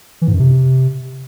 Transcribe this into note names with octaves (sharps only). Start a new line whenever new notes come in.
E3
G#2
F#2
C3